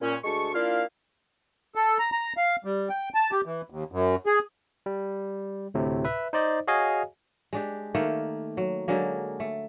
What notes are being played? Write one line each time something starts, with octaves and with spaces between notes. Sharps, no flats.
A#2 C#4
D2 G#3 A5 C#6
A#3 D4 E4 F4 F5
A4
A#5
A#5
F5
G3
G5
A5
G4
E3
D#2
F#2
G#4
G3
D2 A2 C3
B4 E5
D#4 C5 D5 D#5
F#4 G#4 C#5 D#5 F5 G#5
G#3 D4 G4
D#3 A3 A#3
F#3
D3 F#3 G#3 A#3
A3